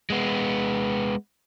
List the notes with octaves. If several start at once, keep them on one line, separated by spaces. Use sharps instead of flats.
G#3 B3